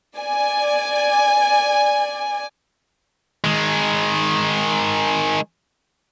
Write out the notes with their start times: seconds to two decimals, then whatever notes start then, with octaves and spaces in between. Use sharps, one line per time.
0.17 D5 G#5
3.44 D#3 G#3